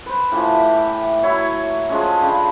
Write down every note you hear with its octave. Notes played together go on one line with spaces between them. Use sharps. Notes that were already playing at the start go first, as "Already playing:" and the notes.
B4 C5
A2 E3 F3
G4
F#3 E4 C#5
F3 G#3 C#4
C#3 D4 G5 B5